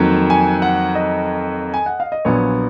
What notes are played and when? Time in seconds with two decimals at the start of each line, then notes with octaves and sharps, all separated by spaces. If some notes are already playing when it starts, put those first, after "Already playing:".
Already playing: F2 D#3 F#3 A#3
0.30 G#5
0.62 F#5
0.95 D#5
1.74 G#5
1.86 F#5
2.00 F5
2.12 D#5
2.25 A#1 A#2 F#3 B3 C#5